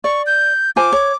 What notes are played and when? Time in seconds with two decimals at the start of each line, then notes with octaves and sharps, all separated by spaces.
0.04 D5 C#6
0.26 G6
0.76 F4 C5 G#5 D6
0.92 C#5